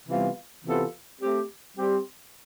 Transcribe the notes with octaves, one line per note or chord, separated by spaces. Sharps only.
C3 E3 G3 B3 F4
C3 E3 B3 F4 A4
A3 C4 G4
G3 C4 G4 C5